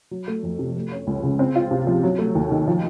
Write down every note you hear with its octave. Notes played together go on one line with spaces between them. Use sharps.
F#3
A3
F2
C3
A3
C#4
C#2
C#3
C4
F4
C3
F3
F#3
A3
D#2
D#3
F3